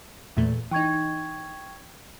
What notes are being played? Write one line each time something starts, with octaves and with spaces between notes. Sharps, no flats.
E2 A#2 A3
E3 D#4 G5 C#6 G#6